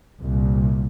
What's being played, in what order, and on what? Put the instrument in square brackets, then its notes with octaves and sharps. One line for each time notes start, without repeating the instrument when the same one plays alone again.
[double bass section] C2 A#2